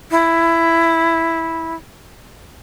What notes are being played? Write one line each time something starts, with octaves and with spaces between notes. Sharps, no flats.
E4